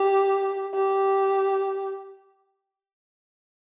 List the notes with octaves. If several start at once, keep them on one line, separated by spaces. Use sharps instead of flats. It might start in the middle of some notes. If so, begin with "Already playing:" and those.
Already playing: G4
G4